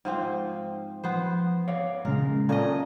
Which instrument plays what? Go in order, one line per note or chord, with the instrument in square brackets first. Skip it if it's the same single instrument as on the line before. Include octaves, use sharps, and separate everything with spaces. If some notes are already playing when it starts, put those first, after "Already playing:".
[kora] G#2 F3 C4
[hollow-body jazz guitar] F3 [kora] B3 C5
[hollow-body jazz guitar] C#5 D5 F5
[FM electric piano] A#2 C#3 [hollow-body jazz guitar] G#3 [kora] A#4
[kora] A#2 D#5 [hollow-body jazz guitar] A#3 C#4 F5 [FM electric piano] A4 A5